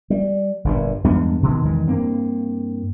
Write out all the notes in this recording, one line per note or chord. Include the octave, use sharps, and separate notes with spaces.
G3
G1 G2 A#2
E2 G2 G#3 B3
B2 D#3 E3
E2 D#3 E3 G#3
G2 A#3 C4